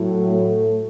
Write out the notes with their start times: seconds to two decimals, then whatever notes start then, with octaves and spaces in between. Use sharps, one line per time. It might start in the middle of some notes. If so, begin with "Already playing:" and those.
Already playing: A2 F#3
0.26 A3